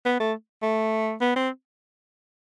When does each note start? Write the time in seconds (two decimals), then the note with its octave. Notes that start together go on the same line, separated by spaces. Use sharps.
0.05 B3
0.20 A3
0.62 A3
1.21 B3
1.36 C4